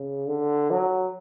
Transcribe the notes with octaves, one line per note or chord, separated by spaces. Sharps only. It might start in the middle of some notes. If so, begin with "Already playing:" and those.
Already playing: C#3
D3
F#3